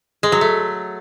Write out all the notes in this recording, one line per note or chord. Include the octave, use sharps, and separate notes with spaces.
G#3
F#3
A3